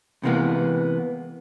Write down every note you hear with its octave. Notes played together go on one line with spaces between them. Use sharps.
C3 E3 G#3 A#3 B3